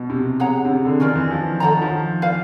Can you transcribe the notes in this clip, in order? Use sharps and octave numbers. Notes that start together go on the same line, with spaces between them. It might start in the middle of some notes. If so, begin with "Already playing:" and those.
Already playing: B2
C3
G#4 C#5 F#5 A#5
C3
C#3
D3
D#3 C#4 F4 A#4 D5
E3
F3
D#3 A4 C#5 F#5 A#5
D#3
F3
B4 D5 F5